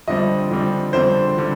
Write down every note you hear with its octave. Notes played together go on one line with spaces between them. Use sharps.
F2 D3 G3 C4 D#5
F2 D3 G3 C4
F2 D3 G3 C4 C5
D3 G3